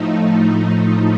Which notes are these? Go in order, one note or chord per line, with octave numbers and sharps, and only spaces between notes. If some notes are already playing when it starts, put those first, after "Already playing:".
Already playing: A2 F3 A3 D#4